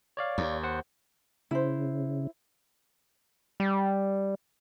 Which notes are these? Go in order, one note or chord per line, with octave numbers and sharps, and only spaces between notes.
C#5 D5 F5
D#2
C5 F#5
C#3 E4 C5
G3